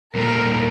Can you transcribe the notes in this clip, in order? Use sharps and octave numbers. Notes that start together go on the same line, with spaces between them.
A#2 G3 A#3 F4 A4 A#4